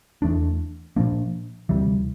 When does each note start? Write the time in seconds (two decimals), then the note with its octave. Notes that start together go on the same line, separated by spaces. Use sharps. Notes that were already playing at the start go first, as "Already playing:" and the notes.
0.22 E2 E3 A3 D4
0.96 A#2 F3 A#3 D4
1.69 D2 C3 E3 G3